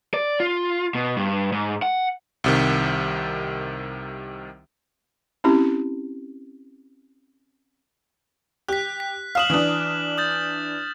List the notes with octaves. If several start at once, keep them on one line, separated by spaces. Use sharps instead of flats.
D5
F4
B2
G2
G#2
F#5
C2 C3 D#3
C4 C#4 E4 G4
G4 F#6 B6
B6
F5 D#6 F6 E7 F#7
E3 D4
D#6 G6 A6